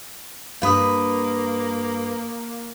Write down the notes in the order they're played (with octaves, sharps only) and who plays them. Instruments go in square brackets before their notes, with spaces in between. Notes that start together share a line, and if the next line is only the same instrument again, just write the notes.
[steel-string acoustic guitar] G2 B4 [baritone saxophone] A#3 [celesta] F5 D#6